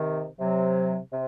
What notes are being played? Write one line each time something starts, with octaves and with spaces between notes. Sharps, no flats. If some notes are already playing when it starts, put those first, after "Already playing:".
Already playing: C3 D#3
C3 F#3
C3